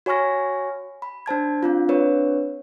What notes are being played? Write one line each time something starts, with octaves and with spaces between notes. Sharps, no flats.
F#4 C#5 G#5 C#6 F6 A#6
B5
D4 C5 A5 G#6
C4 D4 F4
C4 D4 B4 C#5